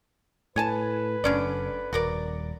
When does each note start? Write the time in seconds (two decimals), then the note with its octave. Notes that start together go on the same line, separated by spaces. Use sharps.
0.56 A2 B4 C#5 G#5 A5
1.24 F#1 D3 C#4 D5
1.93 D#1 F#4 A#4 D5